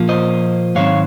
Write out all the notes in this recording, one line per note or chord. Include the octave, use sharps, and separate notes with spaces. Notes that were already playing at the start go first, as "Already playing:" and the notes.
Already playing: A#2 F3 A#3
C5 D#5
G#2 D#3 F#3 C4 C#5 F5